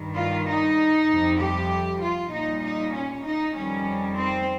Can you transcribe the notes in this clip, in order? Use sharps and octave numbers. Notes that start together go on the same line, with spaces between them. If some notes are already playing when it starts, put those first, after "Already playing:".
Already playing: G2 D#3 G3
F4
D#4
F2 C3 G3
G4
F4
A#2 G3 D#4
D#4
C#4
D#4
F2 D#3 G3 C#4
C4